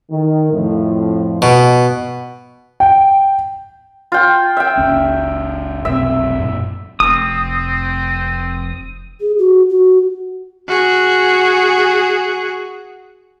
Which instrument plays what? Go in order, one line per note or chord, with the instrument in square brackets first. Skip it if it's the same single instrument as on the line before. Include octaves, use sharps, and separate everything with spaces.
[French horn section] D#3
F2 A2 F3
[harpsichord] B2
[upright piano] G5
[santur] F4 G5
E5 G5
[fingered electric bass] F#1 C#2 C#4
[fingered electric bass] F1 B1 C4 [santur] E5
[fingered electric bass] F#2 A#2
[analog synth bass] F1 [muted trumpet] C4 [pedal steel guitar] D#6
[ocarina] G#4
F#4
F#4
[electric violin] F#4 G#4